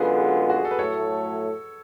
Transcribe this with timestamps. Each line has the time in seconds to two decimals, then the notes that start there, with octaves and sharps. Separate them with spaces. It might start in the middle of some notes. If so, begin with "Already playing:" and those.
Already playing: F#2 D3 G#3 B3 F4 G#4 B4
0.50 F#4
0.56 G#4
0.65 A4
0.71 B4
0.79 A2 F#3 A3 A4 C#5